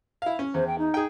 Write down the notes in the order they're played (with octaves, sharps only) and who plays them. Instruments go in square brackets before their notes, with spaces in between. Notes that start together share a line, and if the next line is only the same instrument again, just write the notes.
[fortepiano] E4 F5
C#4
[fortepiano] E2 [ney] C5
[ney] G5
D#4
[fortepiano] G#4 G5